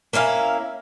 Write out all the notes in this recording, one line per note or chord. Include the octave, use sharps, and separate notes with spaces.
A#3 C#4 E4 F5